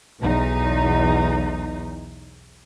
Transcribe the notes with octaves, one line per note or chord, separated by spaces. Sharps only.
B1 E2 D#4